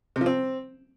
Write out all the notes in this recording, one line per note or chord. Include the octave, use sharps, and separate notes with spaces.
C3
F3
C4